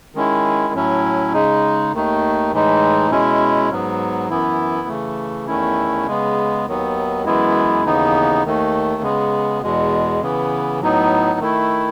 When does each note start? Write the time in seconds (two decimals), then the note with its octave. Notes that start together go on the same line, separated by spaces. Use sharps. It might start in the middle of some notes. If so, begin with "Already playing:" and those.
0.15 D#3 G#3 C#4 E4
0.74 A2 F#3 C#4 E4
1.33 C#3 G#3 D#4
1.93 D#2 D#3 A3 D#4
2.52 A2 E3 G#3 D#4
3.11 B2 G#3 C#4 E4
3.70 G#2 F#3 B3
4.30 F#2 E3 B3 E4
4.88 C#3 E3 A3
5.47 E2 D#3 A3 C#4 E4
6.06 C#3 G#3 B3
6.66 D#2 D#3 F#3 B3
7.25 F#2 E3 G#3 B3 E4
7.84 D#2 C#3 E3 B3 D#4
8.44 D#2 D#3 A3
9.02 C#3 G#3 B3
9.62 E2 B2 G#3
10.21 C#3 E3 B3
10.80 A2 F#3 B3 D#4
11.39 D#3 A3 E4